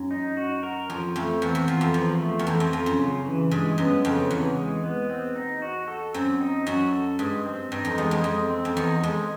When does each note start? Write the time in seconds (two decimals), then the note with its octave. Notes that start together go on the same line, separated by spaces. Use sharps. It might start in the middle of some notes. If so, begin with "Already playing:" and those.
Already playing: F#2
0.11 D#4
0.37 F#4
0.63 A#4
0.89 F2 F3
1.15 F2 A3
1.42 E2 C4
1.55 E2
1.68 E2 F4
1.81 F2
1.94 E2 F3
2.20 A3
2.39 E2
2.47 F2 C4
2.60 F2
2.73 F2 F4
2.86 F#2
2.99 C#3
3.26 E3
3.51 G2 G#3
3.78 F#2 B3
4.04 F2 C#3
4.30 E2 E3
4.57 G#3
4.84 B3
5.09 C4
5.35 D#4
5.62 F#4
5.88 A4
6.14 F#2 C4
6.41 D#4
6.67 F#2 F#4
6.92 A4
7.19 G2 G#3
7.45 C4
7.72 G2 D#4
7.85 F2
7.98 E2 G#3
8.11 F2
8.24 F2 G#3
8.50 C4
8.65 F2
8.77 E2 D#4
9.03 F2 G#3